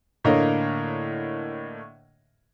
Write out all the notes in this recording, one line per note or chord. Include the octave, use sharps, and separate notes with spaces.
A2 D3 A#3 A#4 C#5 D#5